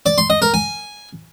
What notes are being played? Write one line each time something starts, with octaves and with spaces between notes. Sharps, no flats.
D5
C6
D#5
A#4
G#5